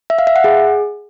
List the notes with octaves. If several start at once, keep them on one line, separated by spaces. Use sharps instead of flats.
E5
F5
E5
F#5
G#4